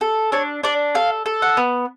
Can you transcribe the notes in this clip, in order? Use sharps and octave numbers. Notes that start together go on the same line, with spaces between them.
A4
D4 C#5
D4 D5
A4 F5
A4
F#5
B3